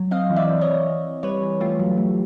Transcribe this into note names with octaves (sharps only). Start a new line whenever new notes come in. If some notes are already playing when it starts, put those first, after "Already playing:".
Already playing: F#3
C4 D#5 F5
E3
D5 E5
C4
C#5 D#5
E3
E3
E3
G3 B4 C#5
E3
A3 F4 G4
F#3
A3